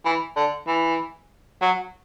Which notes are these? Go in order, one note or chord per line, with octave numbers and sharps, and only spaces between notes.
E3
D3
E3
F#3